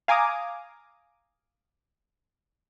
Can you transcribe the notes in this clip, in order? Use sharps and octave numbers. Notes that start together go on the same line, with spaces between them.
F5 G#5 A#5 D6 D#6